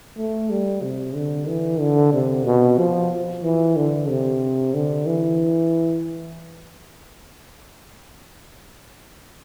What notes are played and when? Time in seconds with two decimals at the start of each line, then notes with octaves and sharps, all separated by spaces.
0.17 A3
0.50 G3
0.82 C3
1.15 D3
1.48 E3
1.80 D3
2.13 C3
2.46 B2
2.78 F3
3.44 E3
3.76 D3
4.09 C3
4.74 D3
5.07 E3